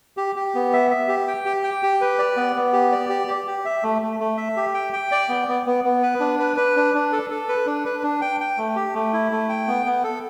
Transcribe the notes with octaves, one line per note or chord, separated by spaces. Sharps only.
G4
G4
B3
E5
E5
G4
G5
G4
G5
G4
B4
D5
B3
B3
G4
D5
G4
G4
G4
E5
A3
A3
A3
E5
G4
G5
G5
D5
B3
B3
B3
B3
B4
D4
B4
B4
D4
D4
A4
A4
B4
D4
B4
D4
G5
G5
A3
G4
A3
E4
A3
G5
B3
B3
A4